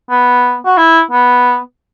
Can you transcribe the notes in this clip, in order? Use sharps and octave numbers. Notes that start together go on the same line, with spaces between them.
B3
F#4
E4
B3